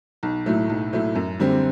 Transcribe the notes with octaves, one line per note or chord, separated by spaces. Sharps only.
B1
A2 F#3 A3
B1
A2 F#3 A3
F#2
D3 G3 C4